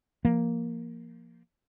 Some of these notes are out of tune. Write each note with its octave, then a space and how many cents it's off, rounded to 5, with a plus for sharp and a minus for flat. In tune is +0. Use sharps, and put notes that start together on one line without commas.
F3 -25 A#3 +0